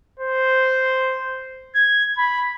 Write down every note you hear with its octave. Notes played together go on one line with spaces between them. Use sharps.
C5
G#6
B5